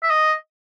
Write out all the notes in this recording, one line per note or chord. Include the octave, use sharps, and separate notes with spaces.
E5
D#5